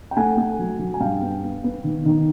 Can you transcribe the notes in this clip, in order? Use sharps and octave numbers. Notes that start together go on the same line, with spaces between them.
G5
A3 F#5 G#5
A3
F#3
F#3
G#5
G2 F5 G5
B3
B3
B3
D#3
D#3